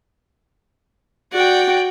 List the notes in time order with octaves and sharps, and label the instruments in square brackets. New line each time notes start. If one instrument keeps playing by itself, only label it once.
[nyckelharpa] F#4 [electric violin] D5 G5